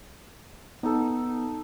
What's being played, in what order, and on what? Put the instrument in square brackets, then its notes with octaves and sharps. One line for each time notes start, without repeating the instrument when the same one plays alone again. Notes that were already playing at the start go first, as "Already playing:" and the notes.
[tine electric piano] B3 [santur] D#4 A4